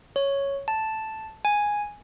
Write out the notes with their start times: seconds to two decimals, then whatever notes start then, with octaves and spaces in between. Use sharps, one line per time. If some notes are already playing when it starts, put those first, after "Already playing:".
0.16 C#5
0.68 A5
1.45 G#5